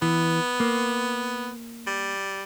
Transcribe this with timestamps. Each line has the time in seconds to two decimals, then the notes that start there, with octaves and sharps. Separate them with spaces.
0.02 E3 B3
0.60 A#3
1.87 G3